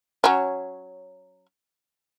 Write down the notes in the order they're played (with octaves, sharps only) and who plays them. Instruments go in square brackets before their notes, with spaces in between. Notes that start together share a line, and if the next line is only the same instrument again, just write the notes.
[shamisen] F#3 C#4